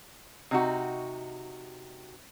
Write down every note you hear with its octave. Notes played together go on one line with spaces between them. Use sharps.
C3 D#4 F#4